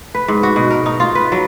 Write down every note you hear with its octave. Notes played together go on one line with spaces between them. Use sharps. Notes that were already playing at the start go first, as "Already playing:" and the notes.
B4
G#2
F#4
B2
A#4
D#4
F4
B4
F#3